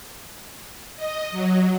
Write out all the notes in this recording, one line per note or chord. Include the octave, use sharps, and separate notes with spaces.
D#5
F#3